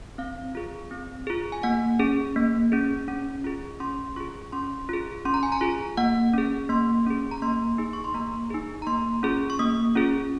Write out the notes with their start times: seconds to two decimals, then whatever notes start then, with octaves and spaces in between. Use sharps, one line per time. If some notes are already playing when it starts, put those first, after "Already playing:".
0.18 C4 F5
0.55 F4 G#4
0.91 C4
1.27 F4 G#4
1.52 G#5
1.63 A#3 F#5
1.99 C#4 G#4
2.36 A#3
2.72 C#4 G#4
3.08 C#4
3.44 F4 G#4
3.80 C#4 C6
4.16 F4 G#4 C#6
4.52 C#4 C6
4.89 F4 G#4
5.25 C#4 C6
5.34 A#5
5.43 G#5
5.52 A#5
5.61 F4 G#4
5.97 A#3 F#5
6.33 C#4 G#4
6.69 A#3 C6
7.06 C#4 G#4
7.31 A#5
7.42 A#3 C6
7.78 D#4 G#4
7.93 C#6
8.04 C6
8.14 A#3 A#5
8.51 D#4 G#4
8.82 A#5
8.87 A#3 C6
9.23 C#4 F4 G#4
9.50 C#6
9.59 A#3 D#6
9.95 C#4 F4 G#4